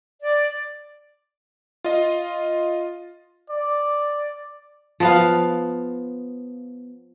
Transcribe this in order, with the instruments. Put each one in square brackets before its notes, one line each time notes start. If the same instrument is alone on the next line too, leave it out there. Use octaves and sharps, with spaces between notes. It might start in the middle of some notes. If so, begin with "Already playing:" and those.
[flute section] D5
[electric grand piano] F4 D#5
[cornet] D5
[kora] F3 B3 F5